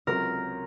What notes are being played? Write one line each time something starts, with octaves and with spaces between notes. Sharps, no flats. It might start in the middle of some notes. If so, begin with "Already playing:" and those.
C#2 C3 F#3 A#4